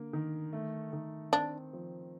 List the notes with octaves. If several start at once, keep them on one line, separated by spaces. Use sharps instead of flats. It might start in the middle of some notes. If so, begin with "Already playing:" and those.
Already playing: D3 A#3
D#3
A3
D#3
C4 D4
F3